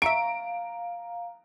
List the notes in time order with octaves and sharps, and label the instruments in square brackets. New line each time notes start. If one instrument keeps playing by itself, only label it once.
[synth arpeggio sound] E5 C#6 [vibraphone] F5 [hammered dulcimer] A#5 [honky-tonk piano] D7